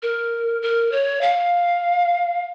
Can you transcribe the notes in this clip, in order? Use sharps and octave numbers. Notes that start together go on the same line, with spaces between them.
A#4
A#4
C#5
F5